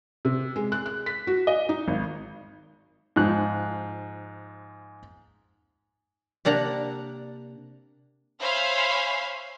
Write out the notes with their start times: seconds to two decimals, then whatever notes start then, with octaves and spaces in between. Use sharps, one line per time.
0.25 C3
0.56 G#3
0.72 F#6
0.86 F#6
1.06 B6
1.27 F#4
1.47 D#5
1.69 D#4
1.88 G#1
3.16 G#2 F3 F#6
6.45 C3 A#3 D4 F#5 A#5
8.41 C5 C#5 E5 F5 G#5 B5